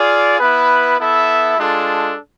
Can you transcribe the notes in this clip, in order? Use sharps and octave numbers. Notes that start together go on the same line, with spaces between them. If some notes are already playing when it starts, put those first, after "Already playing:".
Already playing: F4 G#4 D5 F5
B3 E4 B4
B3 E4 A4 E5
G#3 D4 F4 A4